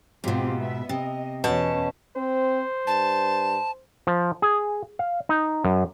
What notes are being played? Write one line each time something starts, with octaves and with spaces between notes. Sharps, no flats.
G#2 B2 C4 F4 G4
B3 E5
C3 D#5
E2 B2 C#4 A5
C4 C5
G2 A5
F3
G#4
F5
D#4
F#2